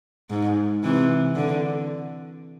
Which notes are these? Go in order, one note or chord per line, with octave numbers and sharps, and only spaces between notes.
G#2
C3 E3
D3